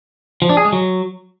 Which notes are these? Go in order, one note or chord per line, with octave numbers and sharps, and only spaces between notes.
F3
D4
G#4
G#3
F#3